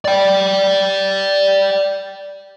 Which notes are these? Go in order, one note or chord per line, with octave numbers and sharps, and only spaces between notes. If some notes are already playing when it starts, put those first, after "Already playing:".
D5 G5